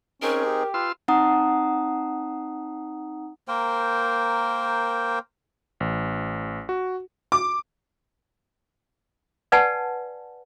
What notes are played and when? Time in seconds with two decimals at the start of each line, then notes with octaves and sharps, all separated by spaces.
0.22 C4 C#4 D#4 G#4 A#4
0.45 G4
0.74 F4 B4 C6 E6
1.08 C4 D#4 F#5 A#5 D#6
3.48 A#3 A#4 C5 G5
5.80 A1
6.69 F#4
7.32 D6
9.52 B4 D5 F#5 G#5 A5